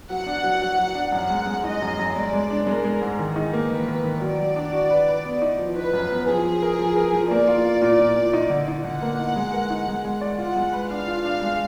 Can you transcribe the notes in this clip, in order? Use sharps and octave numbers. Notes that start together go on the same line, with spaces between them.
F#3 F#5
D4
F#3
F#3
F#3
D4
F#2 F#5
G#3
G#3
D#4 D#5
F#2
F#2
G#3 D5
G#3
D4
G#3 A#4
G#3
G#2
D#3 G#4
D#4
A#3
D#3 B4
D#3
D#3
F#3 D5
F#3
D4
F#4
B4
B4
B3
D#4
F3
D#4 B4
F#2
B3
F3 G#4
F3
A#4
F3
A#4
F3
A#3 D5
F4
F4
A#2
A#2
A#2
D#4
D3
D#4
D3 F#5
A#3
D#4
G#3
A#4
D#4
G#3
G#3
D5
F4 F#5
G#3
B4
D4 F5
F4
D4
G#3